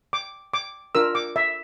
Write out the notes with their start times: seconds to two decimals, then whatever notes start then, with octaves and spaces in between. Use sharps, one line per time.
0.13 D6
0.54 D6
0.95 D4 F4 A#4 E6
1.15 D6
1.36 E5